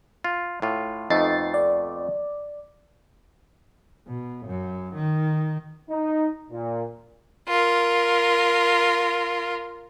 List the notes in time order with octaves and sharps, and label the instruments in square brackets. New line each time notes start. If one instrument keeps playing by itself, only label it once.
[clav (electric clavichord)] F4
A2 F4
[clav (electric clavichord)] F2 A3 B3 [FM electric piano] D#4 A6 C7
[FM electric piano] D5
[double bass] B2
F#2
D#3
[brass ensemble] D#4
A#2
[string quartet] F4 A#4